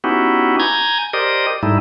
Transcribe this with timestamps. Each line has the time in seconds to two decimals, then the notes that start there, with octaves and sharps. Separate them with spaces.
0.04 B3 C#4 D#4 E4 F#4 G4
0.60 G#5 A#5 G6 G#6
1.13 G4 A#4 C5 D5 D#5 D#6
1.63 G#2 G3 A3 D#4 E4